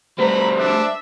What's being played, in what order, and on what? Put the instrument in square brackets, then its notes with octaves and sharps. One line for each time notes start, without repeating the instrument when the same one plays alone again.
[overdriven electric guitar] G3 A3 [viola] B4 A#5 [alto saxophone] C5 [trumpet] B5
[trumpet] D4 [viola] E5